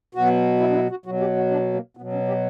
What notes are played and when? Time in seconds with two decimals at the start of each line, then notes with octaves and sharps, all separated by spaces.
0.15 B2 F#3 F#4
0.60 E4
0.70 D4
0.75 E4
0.90 F#4
1.06 B2 F#3 F#4
1.20 G4
1.36 F#4
1.51 D4
1.74 A#3
1.97 B2 B3
2.01 F#3
2.13 C#4
2.28 G4